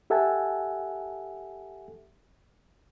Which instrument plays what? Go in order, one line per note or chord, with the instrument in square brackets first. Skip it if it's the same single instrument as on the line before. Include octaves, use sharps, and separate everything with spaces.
[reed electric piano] G4 A4 E5 F#5 G#5 A5